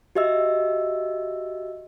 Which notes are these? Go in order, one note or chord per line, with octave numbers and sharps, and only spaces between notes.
F#4 G4 D#5 E5 E6